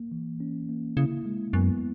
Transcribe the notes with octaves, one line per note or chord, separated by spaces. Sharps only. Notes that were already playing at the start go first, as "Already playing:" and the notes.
Already playing: A#3
E3
C#4
A#3
C#3 E4
G#3
F#2 B3